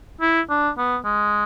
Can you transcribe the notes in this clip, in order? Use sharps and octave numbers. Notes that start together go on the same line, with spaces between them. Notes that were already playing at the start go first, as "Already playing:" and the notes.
E4
D4
B3
G#3